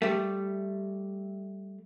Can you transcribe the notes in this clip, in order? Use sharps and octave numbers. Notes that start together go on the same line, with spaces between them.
G3 A3